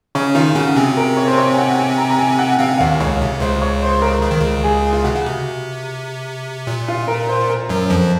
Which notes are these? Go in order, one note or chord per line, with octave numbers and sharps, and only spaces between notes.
C#3 C#4 C#5
D#3 D#4 F4
C#3 C#4 F#4
C3 C4 G#4
A#4
C#5
C5
C#5
G#5
F#5
G#5
A#5
A#5
G#5
F#5
C3 C4 F5
F#5
F5
D#2 D#3
C#2 C#3 C#5
C3
C#2 C#3 C5
C#5
C5
A#4
C#3
D#3
C#2 C#3
G#4
F4
C3 F#4
C#3
C3
A#2
F4
A#4
C5
A#4
F#2 F#3
F2 F3